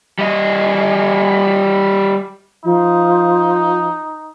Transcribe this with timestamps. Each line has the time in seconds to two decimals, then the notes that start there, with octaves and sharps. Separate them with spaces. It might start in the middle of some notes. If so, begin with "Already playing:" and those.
0.19 G3 D#5
2.64 F3 D#4